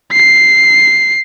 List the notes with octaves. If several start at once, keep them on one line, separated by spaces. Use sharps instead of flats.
C7